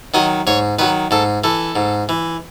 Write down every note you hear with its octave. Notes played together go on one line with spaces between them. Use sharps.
D#3 F#3 D#5
G#2 C#5
D#3 F#3 B4
G#2 A4
E3 A4
G#2
E3